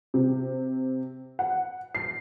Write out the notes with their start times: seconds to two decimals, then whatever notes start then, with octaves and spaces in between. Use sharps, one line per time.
0.14 C3
1.39 F#5
1.95 C7